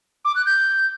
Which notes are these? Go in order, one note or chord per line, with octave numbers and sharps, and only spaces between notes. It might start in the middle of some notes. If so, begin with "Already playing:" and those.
D6
F#6
G6